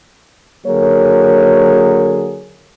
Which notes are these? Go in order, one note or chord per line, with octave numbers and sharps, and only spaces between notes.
D3 F#3 A#3 G#4 A#4 C#5